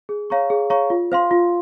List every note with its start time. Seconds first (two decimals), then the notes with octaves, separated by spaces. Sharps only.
0.09 G#4
0.30 C#5 F5 A#5 C#6
0.50 G#4
0.70 C#5 F5 A#5 C#6
0.90 F4
1.12 C5 F5 C6
1.31 F4